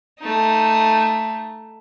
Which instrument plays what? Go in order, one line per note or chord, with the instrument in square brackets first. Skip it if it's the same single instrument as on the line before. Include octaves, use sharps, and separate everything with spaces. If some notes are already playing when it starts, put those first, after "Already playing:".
[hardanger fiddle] A3 D#4